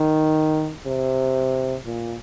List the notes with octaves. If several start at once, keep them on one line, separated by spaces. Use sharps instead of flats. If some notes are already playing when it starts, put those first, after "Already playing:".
Already playing: D#3
C3
A#2